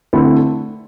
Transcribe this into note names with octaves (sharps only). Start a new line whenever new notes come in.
D3 A3 C4 E4 A4